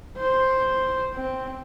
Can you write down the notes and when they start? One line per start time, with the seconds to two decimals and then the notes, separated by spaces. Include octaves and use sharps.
0.17 C5
1.14 C4